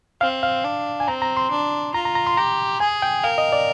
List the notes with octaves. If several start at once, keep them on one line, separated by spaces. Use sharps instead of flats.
C4 F5
F5
D4
G#5
C4 A#5
A#5
C6
D4
F4 A#5
A#5
A#5
C6
G4 A#5
G#4 G#5
G5
A#4 F5
D#5
D5